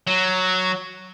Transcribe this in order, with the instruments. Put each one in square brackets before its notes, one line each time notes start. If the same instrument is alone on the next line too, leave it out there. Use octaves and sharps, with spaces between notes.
[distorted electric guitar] F#3